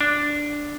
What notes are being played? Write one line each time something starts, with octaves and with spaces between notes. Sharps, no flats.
D4